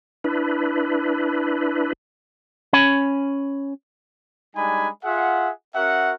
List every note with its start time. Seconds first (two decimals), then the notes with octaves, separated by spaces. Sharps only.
0.24 D4 E4 B4
2.73 C#4 C#5 G#5 B5
4.56 G3 G#3 D4 D#4 G#5 B5
5.04 F4 G#4 E5 F#5
5.75 C#4 F#4 A#4 E5 F#5